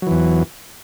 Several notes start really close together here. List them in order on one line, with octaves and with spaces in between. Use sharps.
F#3 E3 E2